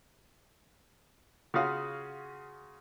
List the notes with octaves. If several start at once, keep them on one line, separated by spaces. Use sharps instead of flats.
C#3 C#4 F4 F#4 F5 D#6